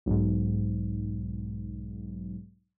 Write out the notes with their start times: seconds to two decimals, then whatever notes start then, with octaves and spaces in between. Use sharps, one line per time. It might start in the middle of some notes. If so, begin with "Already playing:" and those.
0.06 B1 G#2